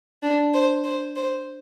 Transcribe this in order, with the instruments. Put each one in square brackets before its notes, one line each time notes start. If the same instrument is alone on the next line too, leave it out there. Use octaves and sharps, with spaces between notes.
[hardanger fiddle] D4
C5
C5
C5